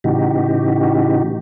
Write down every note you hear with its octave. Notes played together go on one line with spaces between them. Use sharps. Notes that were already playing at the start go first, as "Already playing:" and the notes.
A2 C#3 E3 D#4 F#4 G4